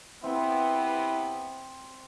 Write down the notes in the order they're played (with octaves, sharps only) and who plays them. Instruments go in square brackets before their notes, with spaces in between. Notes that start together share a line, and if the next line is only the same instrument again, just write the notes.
[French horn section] C3 B3 [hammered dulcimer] C4 [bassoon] E4